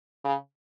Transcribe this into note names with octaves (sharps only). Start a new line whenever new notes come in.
C#3